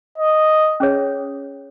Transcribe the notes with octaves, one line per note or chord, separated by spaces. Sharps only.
D#5
C#4 G#4 C#5